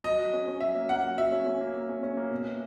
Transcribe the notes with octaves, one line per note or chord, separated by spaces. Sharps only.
F#3 D#5
F#3
C#4
C#4
F#3 E5
A#3
A#3 F#5
F#3
F#3 E5
C#4
C#4
A#3
A#3
C#4
C#4
A#3
B2
B2